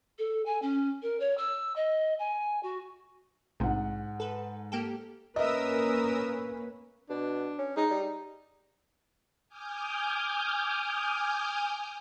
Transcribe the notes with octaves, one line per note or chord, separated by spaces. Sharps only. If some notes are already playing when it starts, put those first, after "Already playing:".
A4
G#5
C#4
A#4
C#5
E6
D#5
G#5
F#4
A#1 G#2 C3 F#5
A4 B4
A#3 G4 A4
A#3 C#4 A#4 B4 D#5 E5 D#6 E6
B2 D4
C#4
G#3 D#4
G3
G#5 D6 D#6 F6 G6